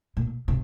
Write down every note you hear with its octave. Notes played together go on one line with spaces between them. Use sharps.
A#2
C3